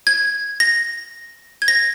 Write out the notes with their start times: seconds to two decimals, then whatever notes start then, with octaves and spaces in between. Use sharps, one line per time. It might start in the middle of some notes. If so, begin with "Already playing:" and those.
0.07 G#6
0.60 A#6
1.62 G#6
1.68 A#6